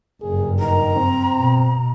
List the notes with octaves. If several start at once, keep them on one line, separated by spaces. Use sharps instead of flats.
F#1 G2 G#4
D#3 A#5
C4
B2